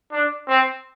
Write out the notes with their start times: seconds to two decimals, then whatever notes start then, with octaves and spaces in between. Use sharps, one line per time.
0.12 D4
0.48 C4